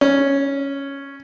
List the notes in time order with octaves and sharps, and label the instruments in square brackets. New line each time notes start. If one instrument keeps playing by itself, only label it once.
[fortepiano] C#4